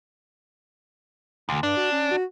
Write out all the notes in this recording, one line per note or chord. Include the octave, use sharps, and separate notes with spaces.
D2
G2 D4
F#4
C#4
F#4